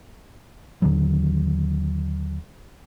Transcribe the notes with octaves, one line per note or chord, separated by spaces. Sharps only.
D#2 D3 D#3 F#3